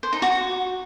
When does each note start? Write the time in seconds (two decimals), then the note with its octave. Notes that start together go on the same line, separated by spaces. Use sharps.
0.03 C5
0.13 D#4
0.22 F#4